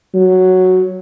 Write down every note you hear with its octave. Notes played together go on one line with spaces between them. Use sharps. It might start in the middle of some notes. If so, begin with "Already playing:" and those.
F#3